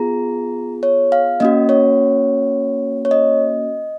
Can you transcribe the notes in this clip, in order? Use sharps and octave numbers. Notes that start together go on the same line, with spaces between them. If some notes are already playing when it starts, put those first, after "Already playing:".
Already playing: B3 F4 G#4 A#5
C#5
F5
A#3 C#4 F#4 D#5
C#5
C#5
D#5